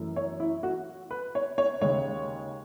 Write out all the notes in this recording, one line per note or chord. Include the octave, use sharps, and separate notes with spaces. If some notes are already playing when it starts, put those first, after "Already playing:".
Already playing: F#2 E3 A3
C#5
E4
F#4
B4
C#5
C#5
D#2 C#3 G#3 C#5